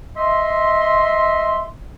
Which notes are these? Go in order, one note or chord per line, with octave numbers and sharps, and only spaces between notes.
D#5 E5 C6